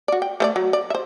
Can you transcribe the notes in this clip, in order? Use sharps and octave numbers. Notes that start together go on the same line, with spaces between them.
F#4 D5
G5
A3 C5 D5
F#3
D5
C5 E5